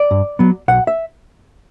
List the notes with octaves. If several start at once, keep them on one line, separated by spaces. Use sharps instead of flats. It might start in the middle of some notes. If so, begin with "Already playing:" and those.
Already playing: D5
G2
F#3 B3
B1 F#5
E5